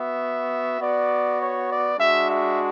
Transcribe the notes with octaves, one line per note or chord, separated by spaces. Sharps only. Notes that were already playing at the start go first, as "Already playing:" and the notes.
Already playing: B3 F#4 E5
B3 F#4 D5
C#5
D5
G#3 D4 F#4 E5
E5